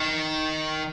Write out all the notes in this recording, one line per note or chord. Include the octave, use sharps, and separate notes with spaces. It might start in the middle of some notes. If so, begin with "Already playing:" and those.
Already playing: D#3